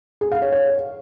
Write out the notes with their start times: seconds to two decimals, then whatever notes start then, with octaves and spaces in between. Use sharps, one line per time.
0.21 G#4
0.32 F5
0.42 C#5
0.52 C#5